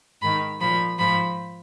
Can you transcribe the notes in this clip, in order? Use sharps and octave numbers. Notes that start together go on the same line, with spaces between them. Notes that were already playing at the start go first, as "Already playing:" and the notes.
G#2 D#3 B5
A#2 F3 B5
G#2 F3 B5